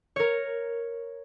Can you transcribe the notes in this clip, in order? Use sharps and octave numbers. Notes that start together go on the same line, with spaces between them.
A#4 C#5